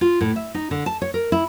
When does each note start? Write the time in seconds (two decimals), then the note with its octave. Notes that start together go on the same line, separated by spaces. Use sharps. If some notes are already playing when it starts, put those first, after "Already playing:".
0.01 F4
0.21 A2
0.36 E5
0.54 D#4
0.71 D3
0.86 A5
1.02 C#5
1.14 A#4
1.32 E4